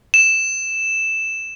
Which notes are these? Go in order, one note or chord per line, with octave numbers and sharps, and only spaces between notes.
E7